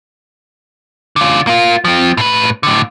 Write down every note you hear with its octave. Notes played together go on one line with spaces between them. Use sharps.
D3 F4
A#3 F4
F3 C4
A2 B4
A2 D3